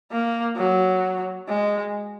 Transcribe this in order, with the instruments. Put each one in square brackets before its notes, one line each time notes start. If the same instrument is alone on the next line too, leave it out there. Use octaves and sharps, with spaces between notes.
[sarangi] A#3
F#3
G#3